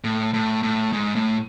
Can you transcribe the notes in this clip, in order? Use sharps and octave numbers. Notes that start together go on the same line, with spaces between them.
A2
A2
A2
G#2
A2